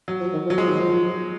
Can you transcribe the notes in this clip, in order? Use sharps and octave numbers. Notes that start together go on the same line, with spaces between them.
F#3
F3
D#3
F3
F#3
F3 G#3
D#3
F3